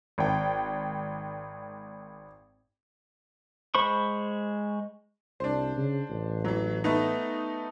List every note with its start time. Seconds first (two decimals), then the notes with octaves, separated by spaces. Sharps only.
0.18 G#1 G5
3.75 G#3 C5 B5 C#6
5.40 C2 D4 C5
5.77 C#3
6.09 A1
6.45 E3 F#3
6.84 A3 B3 D#4